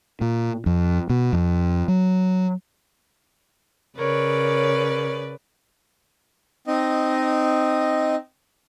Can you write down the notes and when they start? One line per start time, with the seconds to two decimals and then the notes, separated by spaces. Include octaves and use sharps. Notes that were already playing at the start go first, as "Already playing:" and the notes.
0.21 A#2
0.66 F2
1.10 B2
1.33 F2
1.88 F#3
3.98 C#3 A#4 B4 C#5 D5
6.67 C4 D#4 D#5